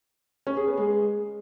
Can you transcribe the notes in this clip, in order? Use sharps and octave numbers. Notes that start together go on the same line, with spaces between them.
C#4
G#4
B3
G#3